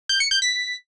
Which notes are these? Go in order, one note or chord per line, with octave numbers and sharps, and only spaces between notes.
G6
C#7
G6
B6